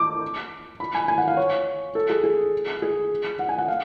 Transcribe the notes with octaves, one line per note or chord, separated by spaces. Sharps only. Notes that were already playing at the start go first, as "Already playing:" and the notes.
Already playing: D6
B5
G#5
G#5
F#5
F5
C#5
A4
G#4
G#4
G#4
F#5
G#5
F#5
F5